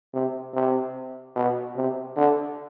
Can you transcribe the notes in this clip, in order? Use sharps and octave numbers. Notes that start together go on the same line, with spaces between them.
C3
C3
B2
C3
D3